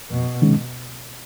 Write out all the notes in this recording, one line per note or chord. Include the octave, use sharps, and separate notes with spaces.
F2 B2
C3 D#3 G#3 C#4